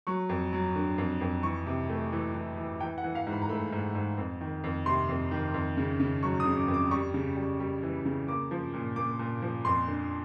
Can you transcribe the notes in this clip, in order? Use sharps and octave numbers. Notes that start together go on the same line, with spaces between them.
F#3 C#6
F2
F#3
D3
F2
F2
E3 C#6
C3
A3
E3
E3
E3
E3 G5
F#5
E3
F5
G#2
B5
A#5
A3 B5
G#2
G#2
F2
D#3
F2
C3 C6
F2
D#3
F2
C#3
C#3
F#3 C#6
D#6
C#3
D6
F2
D6
G3 C#6
C#3
G3
G3
E3
C#3
A#3 D6
F3
A#2
A#2 D6
A#2
F3
F2 C6
D3